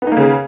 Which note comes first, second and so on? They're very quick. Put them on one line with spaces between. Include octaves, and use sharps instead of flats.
B3 D#4 A#3 C#3